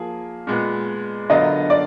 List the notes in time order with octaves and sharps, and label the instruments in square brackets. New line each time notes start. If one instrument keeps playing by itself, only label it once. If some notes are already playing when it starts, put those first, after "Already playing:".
Already playing: [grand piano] F3 A#3 G#4
A#2 G#3 B3
[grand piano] D3 F#3 B3 F4 A#4 [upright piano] D#5
[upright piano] D5